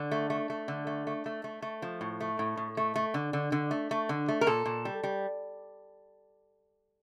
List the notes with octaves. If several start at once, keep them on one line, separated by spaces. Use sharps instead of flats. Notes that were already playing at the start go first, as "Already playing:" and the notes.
Already playing: D3
A3
A3
A3
D3
A3
A3
A3
A3
A3
F3
A2
A3
A2
A2
A3
A3
D3
D3
D3
A3
A3
D3
A3
A#4
A#2 A4
A#2
G3
G3